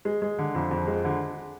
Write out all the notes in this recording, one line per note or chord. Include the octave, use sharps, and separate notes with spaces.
G#3
G#3
D3
F2
F2
G#3
D3